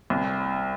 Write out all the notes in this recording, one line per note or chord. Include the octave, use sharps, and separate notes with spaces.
C2